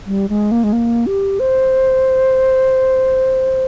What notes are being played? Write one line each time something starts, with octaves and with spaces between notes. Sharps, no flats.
G3
G#3
A#3
G#3
A#3
G4
C5